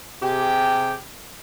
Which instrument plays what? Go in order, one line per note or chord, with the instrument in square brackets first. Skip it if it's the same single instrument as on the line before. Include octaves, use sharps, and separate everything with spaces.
[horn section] C3 G4 G#4 G5